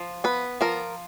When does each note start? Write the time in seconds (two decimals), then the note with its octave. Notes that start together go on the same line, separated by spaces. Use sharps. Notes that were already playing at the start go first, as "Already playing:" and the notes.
Already playing: F3
0.24 B3 B4
0.61 F3 A#4